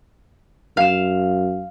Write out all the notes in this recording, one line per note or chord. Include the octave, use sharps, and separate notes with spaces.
F#2 F5 E7